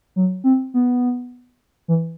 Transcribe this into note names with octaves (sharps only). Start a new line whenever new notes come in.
F#3
C4
B3
E3